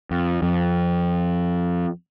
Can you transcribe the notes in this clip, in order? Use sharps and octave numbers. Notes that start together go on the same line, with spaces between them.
F2
F2